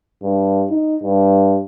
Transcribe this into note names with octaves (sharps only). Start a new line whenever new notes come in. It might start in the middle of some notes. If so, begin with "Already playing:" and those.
G2
D#4
G2